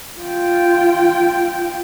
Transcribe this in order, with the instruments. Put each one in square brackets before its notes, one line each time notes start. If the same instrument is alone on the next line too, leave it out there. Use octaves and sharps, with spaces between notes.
[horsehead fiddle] F4 G5